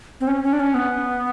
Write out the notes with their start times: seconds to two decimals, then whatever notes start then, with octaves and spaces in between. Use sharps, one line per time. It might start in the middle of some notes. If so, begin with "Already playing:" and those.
0.21 C4
0.27 C#4
0.44 C#4
0.53 D4
0.60 C#4
0.74 B3